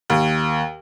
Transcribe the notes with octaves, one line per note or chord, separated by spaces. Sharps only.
D#2